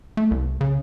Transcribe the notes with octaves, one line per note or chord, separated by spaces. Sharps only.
A3
C2
C#3